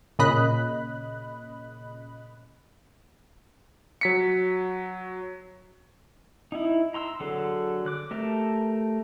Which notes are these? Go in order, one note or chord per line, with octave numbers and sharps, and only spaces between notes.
A#2 C#3 D#5 B5 F#6
F#3 B6 C#7
D#4 E4
A#5 C6 E6
D3 F#3 G#4 A4
D6 F#6
A3 G4 A4 A#4